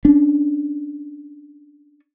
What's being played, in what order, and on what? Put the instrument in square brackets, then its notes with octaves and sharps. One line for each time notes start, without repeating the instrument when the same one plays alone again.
[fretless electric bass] C#4 D4